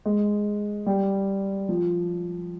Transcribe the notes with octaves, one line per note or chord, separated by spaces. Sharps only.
G#3
G3
F3